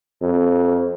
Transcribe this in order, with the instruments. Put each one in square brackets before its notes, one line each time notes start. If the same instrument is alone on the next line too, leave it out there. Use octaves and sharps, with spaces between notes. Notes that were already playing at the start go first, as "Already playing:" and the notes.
[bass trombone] F2